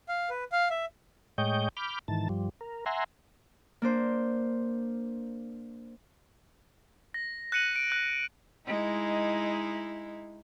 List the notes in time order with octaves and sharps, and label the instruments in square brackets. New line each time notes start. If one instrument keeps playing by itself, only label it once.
[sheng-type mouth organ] F5
B4
F5
E5
[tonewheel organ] A2 G#3 C#5 D#5 G5 G6
B5 D6 F6 G6
G#2 D#3 E3 A5
G2 F3 G3
A#4
E5 F#5 G#5 A#5 C6
[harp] A#3 D4 C5
[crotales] A#6
F#6 A#6 C#7 D#7 F#7
D7
F#6 F#7
[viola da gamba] G#3 D#4 E4